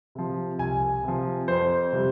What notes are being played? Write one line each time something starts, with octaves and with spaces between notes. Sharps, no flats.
C3 F3
C2 G#5
C3 F3
F2 C5
C3 G3